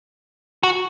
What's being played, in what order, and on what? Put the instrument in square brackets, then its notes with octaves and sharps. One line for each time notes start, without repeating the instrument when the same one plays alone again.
[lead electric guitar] F#4